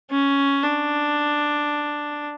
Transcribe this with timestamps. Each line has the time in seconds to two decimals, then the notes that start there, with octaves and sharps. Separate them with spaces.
0.11 C#4
0.62 D4